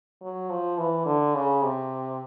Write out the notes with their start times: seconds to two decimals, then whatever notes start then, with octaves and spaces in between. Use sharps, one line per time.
0.22 F#3
0.50 F3
0.78 E3
1.06 D3
1.35 C#3
1.62 C3